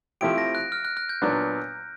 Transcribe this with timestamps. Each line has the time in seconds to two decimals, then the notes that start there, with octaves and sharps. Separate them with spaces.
0.21 F3 A3 C4 E4 G4 D7
0.38 A#6
0.55 F#6
0.72 F6
0.85 F#6
0.97 F#6
1.09 G6
1.22 A#2 F#3 B3 D4